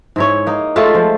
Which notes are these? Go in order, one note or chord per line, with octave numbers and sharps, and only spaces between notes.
G#2 E4 C#5
A#3 D#4
G#3 A3 F4 A4
F3